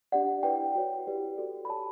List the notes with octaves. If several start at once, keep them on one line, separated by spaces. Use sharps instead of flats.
D4 G4 D5 F#5
E4 B4 D5 G5
F#4 C#5
E4 G4 B4 D5
F#4 A4 D5
B5
G4 C#5 A5